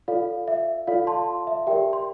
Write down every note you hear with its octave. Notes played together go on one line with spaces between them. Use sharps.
F4 A4 D5 F5
E5
F4 A4 D5 F5
A5 C6
E5
G4 A#4 D5 E5 G5
C6